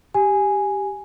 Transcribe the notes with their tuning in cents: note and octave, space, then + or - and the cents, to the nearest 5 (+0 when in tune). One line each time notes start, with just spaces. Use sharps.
G4 +0 G#5 +0